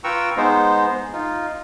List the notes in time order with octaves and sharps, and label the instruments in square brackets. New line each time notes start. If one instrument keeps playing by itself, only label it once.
[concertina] F4 B4 G5 A#5 C#6 E6
G#3 B3 D#4 C5
D#4 F4